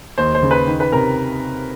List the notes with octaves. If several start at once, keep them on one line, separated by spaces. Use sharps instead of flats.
D#2 C5
C5
C#3
B4
D#3
B4
C3 A#4